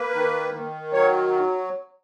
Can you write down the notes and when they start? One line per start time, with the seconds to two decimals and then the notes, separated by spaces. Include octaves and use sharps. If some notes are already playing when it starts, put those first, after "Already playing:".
Already playing: A#3 B4
0.14 D#3
0.54 D#3
0.93 F#3 C#5